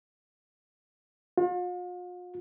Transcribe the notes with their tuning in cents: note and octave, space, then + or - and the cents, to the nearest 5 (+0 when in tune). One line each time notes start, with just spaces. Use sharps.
F4 +45